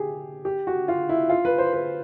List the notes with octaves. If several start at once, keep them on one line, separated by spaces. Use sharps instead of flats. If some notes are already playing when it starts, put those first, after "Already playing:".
Already playing: G4 G#4
G4
F#4
F4
E4
F4
B4
C5
B4